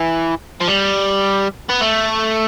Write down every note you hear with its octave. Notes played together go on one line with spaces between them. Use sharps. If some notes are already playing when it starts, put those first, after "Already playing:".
Already playing: E3
F3
G3
B3
A3